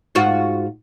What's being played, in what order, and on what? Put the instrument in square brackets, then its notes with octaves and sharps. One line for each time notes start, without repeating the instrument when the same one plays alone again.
[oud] G#2 F4 F#4